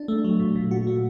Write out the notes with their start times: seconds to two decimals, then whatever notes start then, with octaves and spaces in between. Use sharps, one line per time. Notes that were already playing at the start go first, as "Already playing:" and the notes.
Already playing: D4
0.08 A3
0.24 F#3
0.39 A#2
0.56 A#2
0.71 F#4
0.87 A3